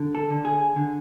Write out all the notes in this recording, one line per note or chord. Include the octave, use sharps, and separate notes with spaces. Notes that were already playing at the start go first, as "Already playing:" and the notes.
Already playing: D3
A4
D3
G#4
D3